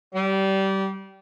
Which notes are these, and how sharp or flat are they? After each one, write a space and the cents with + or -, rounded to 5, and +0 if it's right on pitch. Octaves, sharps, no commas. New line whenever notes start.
G3 -20